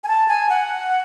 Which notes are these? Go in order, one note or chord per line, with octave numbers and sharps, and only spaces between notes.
G#5
A5
G#5
F#5